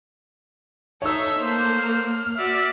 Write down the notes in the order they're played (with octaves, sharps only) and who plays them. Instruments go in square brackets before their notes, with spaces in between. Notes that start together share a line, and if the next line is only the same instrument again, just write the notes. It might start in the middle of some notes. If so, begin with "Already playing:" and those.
[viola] D#4 [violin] A4 E5 [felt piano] C#5 E6
[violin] A3 [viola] A#3 [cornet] C5
[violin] F6
[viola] F#4 D5 [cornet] E5